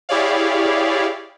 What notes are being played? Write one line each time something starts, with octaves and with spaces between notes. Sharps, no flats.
E4 G4 G#4 C#5 D5 F5